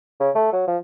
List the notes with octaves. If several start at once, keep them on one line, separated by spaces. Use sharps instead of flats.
C#3
A3
F#3
F3